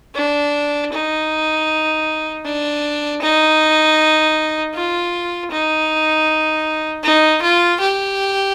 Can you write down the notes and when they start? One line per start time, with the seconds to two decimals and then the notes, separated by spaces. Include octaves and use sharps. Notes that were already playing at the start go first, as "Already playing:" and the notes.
0.15 D4
0.92 D#4
2.45 D4
3.22 D#4
4.75 F4
5.51 D#4
7.04 D#4
7.42 F4
7.80 G4